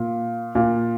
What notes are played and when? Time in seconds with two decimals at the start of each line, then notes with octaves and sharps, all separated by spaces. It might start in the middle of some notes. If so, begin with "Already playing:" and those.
Already playing: A#2
0.55 A#2